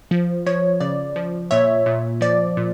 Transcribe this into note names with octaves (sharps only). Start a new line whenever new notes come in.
F3
F3 C#5
C#3 D5
F3
A#2 C#5 E5
A#2
F3 D5
A#2